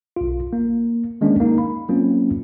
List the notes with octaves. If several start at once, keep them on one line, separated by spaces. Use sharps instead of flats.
B1 F4
A#3
D#3 G#3 A#3 C#4 D4
A#3 D#4
B5
F#3 A#3 C4 C#4 F4